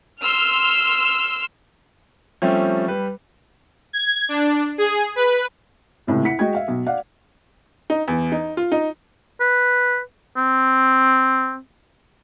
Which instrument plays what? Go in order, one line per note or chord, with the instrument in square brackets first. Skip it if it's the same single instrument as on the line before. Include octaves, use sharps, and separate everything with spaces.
[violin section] C6 E6 F6
[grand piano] F3 G3 A3 C4 C#4 G4
G3 B4
[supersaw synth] G#6
D4
G#4
B4
[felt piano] C#2 A2 C3
E4 F#5 B6 C#7
G#3 F#4 D#5 G5 G#6
E5 F5
B1
D5 F5 F#5
[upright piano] D#4
E2
D#4
F4
D#4
[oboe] B4
C4